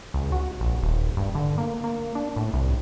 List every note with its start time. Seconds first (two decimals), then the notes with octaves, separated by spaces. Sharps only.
0.14 C#2
0.32 F#4
0.61 A#1
0.83 D#1
1.17 G2
1.35 D3
1.58 A#3
1.84 A#3
2.15 D4
2.36 A2
2.53 C2